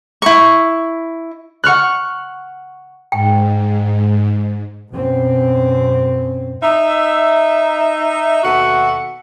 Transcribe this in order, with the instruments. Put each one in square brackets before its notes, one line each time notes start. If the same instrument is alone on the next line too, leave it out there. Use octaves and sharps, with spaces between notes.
[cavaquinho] E4 C#6
[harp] F#5 C#6 F6 F#6
[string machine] G#2 [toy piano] G5
[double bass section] F#2 B2 C4
[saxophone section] D#4 E5
D#2 B2 F#4 A4 E5 F#5